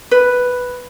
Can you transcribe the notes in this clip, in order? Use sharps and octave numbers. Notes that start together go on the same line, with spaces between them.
B4